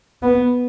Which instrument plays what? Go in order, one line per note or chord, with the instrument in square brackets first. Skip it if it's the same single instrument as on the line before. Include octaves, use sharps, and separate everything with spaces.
[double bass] B3